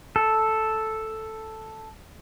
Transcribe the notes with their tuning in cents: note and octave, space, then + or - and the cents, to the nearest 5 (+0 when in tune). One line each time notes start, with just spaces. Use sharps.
A4 +0